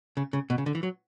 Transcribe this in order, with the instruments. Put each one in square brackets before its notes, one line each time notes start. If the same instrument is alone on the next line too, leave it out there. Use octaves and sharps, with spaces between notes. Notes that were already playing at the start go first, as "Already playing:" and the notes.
[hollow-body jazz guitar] C#3
C#3
B2
C#3
D3
E3
F#3